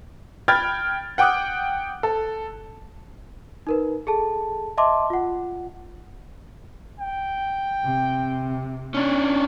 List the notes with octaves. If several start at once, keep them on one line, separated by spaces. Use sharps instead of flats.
G5 B5 F6 G#6 A6
F#5 G5 D6 D#6 F#6
A4
D#4 A#4 B4
G#4 A4 A5
D#5 E5 A5 C6 D6
F4 F#5
G5
C3
C#4 D4